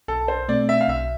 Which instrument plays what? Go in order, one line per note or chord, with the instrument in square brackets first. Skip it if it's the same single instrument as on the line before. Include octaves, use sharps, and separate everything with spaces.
[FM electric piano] B1 [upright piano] A4
[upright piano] C5
[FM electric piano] B2 A3 C4 [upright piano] D5
[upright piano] E5
F5
[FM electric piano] B1 [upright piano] E5